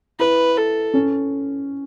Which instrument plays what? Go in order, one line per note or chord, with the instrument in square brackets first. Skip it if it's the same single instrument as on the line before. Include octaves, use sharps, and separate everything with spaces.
[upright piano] E4 [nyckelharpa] B4
[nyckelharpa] A4
[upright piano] C#4